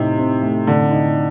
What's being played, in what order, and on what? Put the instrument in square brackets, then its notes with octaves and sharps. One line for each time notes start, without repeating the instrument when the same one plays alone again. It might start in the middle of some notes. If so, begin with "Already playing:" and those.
Already playing: [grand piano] A2 A3 C4 D#4 [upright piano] C3
[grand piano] C4
A3
[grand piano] A2 [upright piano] D3
[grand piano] D#4